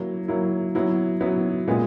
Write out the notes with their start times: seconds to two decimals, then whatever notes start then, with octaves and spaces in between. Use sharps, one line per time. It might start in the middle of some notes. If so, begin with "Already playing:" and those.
Already playing: F#3 A#3 E4
0.28 F#3 A#3 E4
0.75 F#3 B3 E4
1.20 F#3 B3 E4
1.68 A#2 G#3 B3